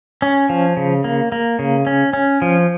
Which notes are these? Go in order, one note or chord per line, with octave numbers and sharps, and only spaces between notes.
C#4
F3
C#3
A#3
A#3
C#3
C#4
C#4
F3